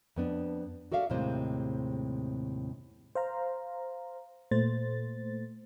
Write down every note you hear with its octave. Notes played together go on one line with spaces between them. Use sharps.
F2 B3 D4
F#4 A4 D5 E5 F5
D#2 A2 C3 G#3 C4 C5
C5 F5 A#5
A#2 A3 C5 A6